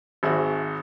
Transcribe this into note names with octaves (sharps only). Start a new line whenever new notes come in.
G#1 F#4 G#4 E5